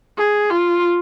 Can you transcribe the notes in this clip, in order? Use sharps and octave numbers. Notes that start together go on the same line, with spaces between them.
G#4
F4